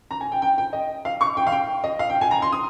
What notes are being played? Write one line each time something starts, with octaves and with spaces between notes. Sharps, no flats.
A#5
G#5
G5
G5
G5
D#5
F5
C#6
G5
F5
G5
D#5
F5
G5
G#5
A#5
C6
D#6